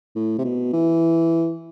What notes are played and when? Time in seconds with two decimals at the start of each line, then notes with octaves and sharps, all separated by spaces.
0.16 A2
0.38 C3
0.45 B2
0.73 E3